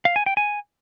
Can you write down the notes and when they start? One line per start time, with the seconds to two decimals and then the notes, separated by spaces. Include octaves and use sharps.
0.05 F5
0.16 G#5
0.26 G5
0.37 G#5